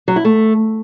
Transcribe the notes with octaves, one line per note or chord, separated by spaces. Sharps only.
F#3
E4
A3